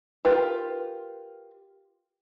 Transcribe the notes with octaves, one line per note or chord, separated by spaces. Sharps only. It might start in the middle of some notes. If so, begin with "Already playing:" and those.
F4 G4 A#4 B4